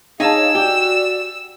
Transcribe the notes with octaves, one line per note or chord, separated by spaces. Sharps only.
D#4 G#4 C#5 F5 G#5 A5 E6
F#4 G4 D5